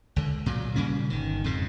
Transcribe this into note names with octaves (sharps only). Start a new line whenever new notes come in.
C#2 D3
A#2 C#3 F#3
A#2 C#3 G3 C#4
G1 D#3
F2 G#2 C#3